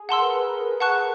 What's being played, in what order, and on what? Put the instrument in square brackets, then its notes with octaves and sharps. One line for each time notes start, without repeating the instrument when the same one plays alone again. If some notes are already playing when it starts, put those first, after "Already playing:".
Already playing: [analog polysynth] G#4
[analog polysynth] A#4 [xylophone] F#5 A5 C6 E6
[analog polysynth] B4
A#4
[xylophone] F#5 A5 C#6 F#6